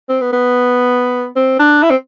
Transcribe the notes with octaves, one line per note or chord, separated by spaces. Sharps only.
C4
B3
B3
C4
D4
E4
C4